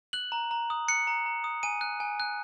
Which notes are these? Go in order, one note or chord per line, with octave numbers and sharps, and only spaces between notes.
F#6 F#7
A#5
A#5
D#6
F#6 C#7
A#5
A#5
D#6
G#5 D#7
F#6
G#5
F#6